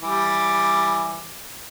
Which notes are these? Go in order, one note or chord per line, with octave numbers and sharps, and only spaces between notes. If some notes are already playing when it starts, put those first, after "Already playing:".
E3 G3 D6